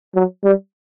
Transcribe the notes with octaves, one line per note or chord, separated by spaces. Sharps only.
F#3
G3